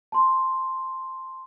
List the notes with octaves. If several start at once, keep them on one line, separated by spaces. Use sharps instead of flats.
A5 C6